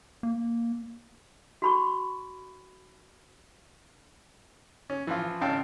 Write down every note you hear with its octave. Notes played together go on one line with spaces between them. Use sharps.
A#3
F#4 B5 C#6
C#4
E3 F3 F4
G#1 C#3 F5 G5 A5